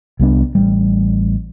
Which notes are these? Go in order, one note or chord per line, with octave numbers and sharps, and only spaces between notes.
C2 G3 B3 D4
A1 G3